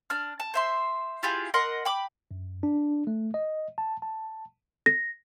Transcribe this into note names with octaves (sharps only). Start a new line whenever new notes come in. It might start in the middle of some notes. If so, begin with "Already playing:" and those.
D4 F6
A5
C5 E5 C6
E4 F4 G4 G#4
A#4 D#5 F#5 C6
G5 B5 D6
F#2
D4
A3
D#5
A5
A5
A#6